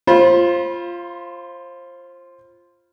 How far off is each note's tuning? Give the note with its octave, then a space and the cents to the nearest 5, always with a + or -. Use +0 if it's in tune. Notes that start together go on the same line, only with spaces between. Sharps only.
F4 -10 C5 +25 B5 -20